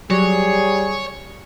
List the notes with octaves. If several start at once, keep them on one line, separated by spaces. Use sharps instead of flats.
F#3 G3 G#4 C#5